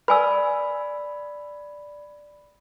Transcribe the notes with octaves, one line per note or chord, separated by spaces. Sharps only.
B4 D5 G#5 B5 E6